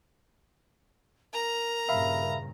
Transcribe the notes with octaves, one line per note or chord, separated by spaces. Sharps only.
A#4 A#5
G2 A#2 C#3 E5 F5 B5